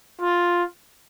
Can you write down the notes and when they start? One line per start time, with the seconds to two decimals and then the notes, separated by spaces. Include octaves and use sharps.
0.21 F4